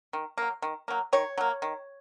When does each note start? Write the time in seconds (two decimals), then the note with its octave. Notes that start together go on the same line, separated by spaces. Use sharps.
0.13 D#3
0.38 F#3 A#3
0.62 D#3
0.88 F#3 A#3
1.13 D#3 C#5
1.38 F#3 A#3
1.62 D#3